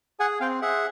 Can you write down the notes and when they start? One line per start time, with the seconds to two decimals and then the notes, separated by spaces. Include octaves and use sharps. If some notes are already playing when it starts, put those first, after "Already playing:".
0.20 G#4 F#5 G#5
0.40 C4 F5 G5
0.62 G#4 E5 F#5